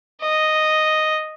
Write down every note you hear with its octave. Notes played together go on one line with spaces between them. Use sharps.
D#5